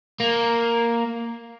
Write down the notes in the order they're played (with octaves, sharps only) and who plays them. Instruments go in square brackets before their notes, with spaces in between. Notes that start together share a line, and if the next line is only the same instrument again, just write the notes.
[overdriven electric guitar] A#3